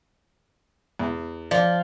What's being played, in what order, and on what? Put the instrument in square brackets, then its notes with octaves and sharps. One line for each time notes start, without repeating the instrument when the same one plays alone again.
[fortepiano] E2
[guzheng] F3 [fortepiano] D5